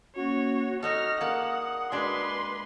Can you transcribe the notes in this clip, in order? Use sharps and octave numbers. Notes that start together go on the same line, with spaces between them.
A#3 C#4 F#4 C#5
D#4 F#4 A4 D#5 D#6 F6 A#6
A#3 G#4 D5 F#5 A5
G#3 D4 F#4 B4 C6 D6